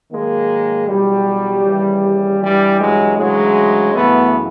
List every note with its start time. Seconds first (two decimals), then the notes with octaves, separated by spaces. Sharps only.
0.11 G#2 D#3 F#3 G#3 A#3
0.87 E2 B2 F#3 G3
1.64 D#2 C#3 E3
2.41 G2 E3 G3
2.79 F#3 G#3
3.17 D2 C#3 E3 F#3 G#3
3.94 F#2 C#3 E3 A3 B3